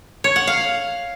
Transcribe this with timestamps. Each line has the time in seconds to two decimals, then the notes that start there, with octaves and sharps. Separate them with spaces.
0.24 C#5
0.36 F#5
0.47 F5